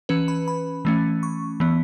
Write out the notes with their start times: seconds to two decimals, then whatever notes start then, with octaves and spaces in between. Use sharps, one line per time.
0.09 E3 C#4 B4
0.28 B5
0.48 B5
0.85 E3 A3 C#4
1.23 C#6
1.60 E3 B3